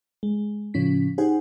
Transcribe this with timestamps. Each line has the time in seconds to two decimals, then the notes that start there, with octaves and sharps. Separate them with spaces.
0.23 G#3
0.74 A2 C#3 F3 C#4 B6
1.18 D#4 G4 G#4 C5 F#5 G#5